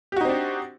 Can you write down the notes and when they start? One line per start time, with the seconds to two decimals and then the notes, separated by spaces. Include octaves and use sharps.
0.12 G4
0.16 F#4
0.21 D#4
0.25 C4
0.29 D4